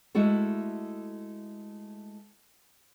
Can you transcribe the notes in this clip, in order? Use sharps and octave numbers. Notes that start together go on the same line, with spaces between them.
G#3 A3 E4 F#4 A4